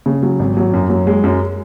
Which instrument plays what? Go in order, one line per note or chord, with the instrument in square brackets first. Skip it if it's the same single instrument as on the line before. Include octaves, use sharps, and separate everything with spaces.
[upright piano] C#3
F#3
G#1
F#3
F#2
F#3
G#3
F#2